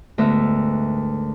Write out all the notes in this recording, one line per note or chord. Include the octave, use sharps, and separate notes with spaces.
D2 G#2 B3 A#4 E5